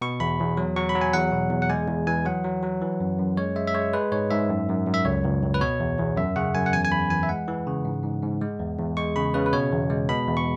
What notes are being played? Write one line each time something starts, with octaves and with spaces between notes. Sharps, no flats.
B2 C#6
E2 B5
E2
F#3
F#3 C#6
B5
F#3
G#5
E2 F#5
B2
E2
F#5
G#3 G#5
E2
E3 G#5
F#3 F#5
F#3
F#3
E3
F#2
F#2
G#3 C#5
G#3 E5
E5
G#3 C#5
G#3 B4
G#2 C#5
G#2 E5
F#2
F#2
F#2
E5
C#2 C#5
C#2
C#2
B4
B2 C#5
E2
E2
F#2 E5
C#3 F#5
F#2 G#5
F#5
E2 G#5
G#5
E2 B5
E3 G#5
E5
G#3 F#5
E3
C#3
G#2
G#2
G#2
G#3
E2
E2
G#3 C#6
C#3 B5
C#3 B4
B4
B2 C#5
E2
G#3
B2 B5
E2
C#6